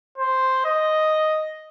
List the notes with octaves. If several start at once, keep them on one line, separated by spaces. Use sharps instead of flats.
C5
D#5